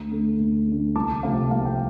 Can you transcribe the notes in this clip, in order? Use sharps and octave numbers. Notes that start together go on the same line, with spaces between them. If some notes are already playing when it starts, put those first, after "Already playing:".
Already playing: D2
D3 A3
D2
D3 A3
C2 A5 D6
C3 F3 A3 C4 F5
C2 F5
G5